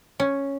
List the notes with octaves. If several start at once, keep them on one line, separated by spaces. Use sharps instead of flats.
C#4